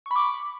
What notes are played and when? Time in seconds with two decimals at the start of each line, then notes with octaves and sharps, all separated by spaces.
0.06 C#6
0.11 B5
0.16 D6